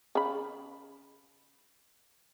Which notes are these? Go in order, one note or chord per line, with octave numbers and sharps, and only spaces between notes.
C#3 B5